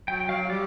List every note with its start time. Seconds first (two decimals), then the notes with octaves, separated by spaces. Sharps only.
0.08 F#3 G5
0.29 F#3 F5
0.50 G3 D5